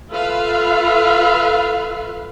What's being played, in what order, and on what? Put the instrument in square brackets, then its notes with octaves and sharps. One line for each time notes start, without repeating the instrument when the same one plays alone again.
[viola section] F4 A4 B4 E5 F5